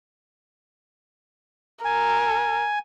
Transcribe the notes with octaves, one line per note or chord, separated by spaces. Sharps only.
A#4 G#5